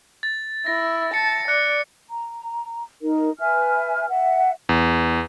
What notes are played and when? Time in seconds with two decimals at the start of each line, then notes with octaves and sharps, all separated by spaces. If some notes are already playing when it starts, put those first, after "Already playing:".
0.23 A6
0.66 E4 A#6
1.14 A5 C#7
1.48 D5 F#6 C#7
2.10 A#5
3.01 D#4 A#4
3.40 B4 E5 G#5 F6
4.09 E5 F#5
4.69 E2